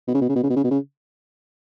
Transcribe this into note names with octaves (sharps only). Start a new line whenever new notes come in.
B2
C#3
B2
C#3
B2
C#3
B2
C#3
B2
C#3